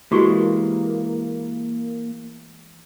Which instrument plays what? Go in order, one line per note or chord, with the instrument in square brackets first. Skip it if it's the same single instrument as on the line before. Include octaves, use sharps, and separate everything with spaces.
[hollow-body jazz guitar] E3 G#3 [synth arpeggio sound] A#3 [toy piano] F#4 G4 C#6